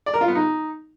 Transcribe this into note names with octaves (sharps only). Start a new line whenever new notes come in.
D5
A#4
F4
B3
D#4